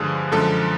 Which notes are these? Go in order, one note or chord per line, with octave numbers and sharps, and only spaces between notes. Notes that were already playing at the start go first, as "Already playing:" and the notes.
Already playing: G2 D3 F3 G#3 G#4
F#2 D3 F3 G#3 A4